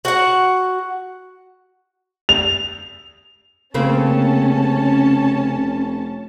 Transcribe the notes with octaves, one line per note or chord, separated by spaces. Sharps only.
F#4 F#5
F7
F1 C#3 A#3 C4 C#4 A5